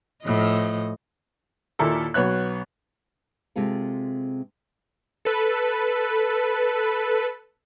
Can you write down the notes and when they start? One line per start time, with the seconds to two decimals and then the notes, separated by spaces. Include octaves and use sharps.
0.25 A2 F3 D#5
1.79 D#2 A#2 E4 A4 A#4 E6
2.14 B1 B3 C#5 F#6
3.56 C3 G#3 C4 F4 A4
5.25 A4 B4